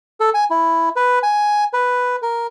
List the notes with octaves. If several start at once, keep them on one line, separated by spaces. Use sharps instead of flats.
A4
G#5
E4
B4
G#5
B4
A#4